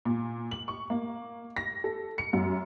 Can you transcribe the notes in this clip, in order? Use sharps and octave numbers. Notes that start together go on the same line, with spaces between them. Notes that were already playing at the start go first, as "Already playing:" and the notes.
A#2
F#7
C#6
A#3
A#6
A4
C#7
F#2